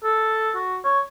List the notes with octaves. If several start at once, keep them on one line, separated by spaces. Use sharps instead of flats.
A4
F#4
C#5